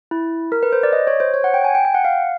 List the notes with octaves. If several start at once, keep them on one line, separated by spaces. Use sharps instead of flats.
E4
A#4
B4
C5
D5
D#5
C#5
C5
C#5
F#5
G5
G#5
G5
G5
F#5
F5